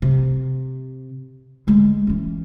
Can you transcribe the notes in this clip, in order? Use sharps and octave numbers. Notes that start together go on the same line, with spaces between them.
C3
D3 G#3
E3 C#4